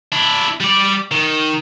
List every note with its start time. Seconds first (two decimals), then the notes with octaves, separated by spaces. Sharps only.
0.12 D4 E4
0.60 G3 D5
1.11 D#3